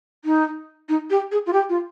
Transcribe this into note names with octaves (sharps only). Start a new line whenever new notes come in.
D#4
D#4
G4
G#4
F4
G4
F4